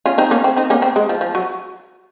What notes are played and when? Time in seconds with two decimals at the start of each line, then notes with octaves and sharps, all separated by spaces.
0.06 C#4 F4
0.18 C4 D#4
0.31 A#3 C#4
0.44 C4
0.56 C4 D#4
0.70 A#3 C#4
0.82 C4
0.96 G#3
1.09 F3
1.21 F3
1.35 F#3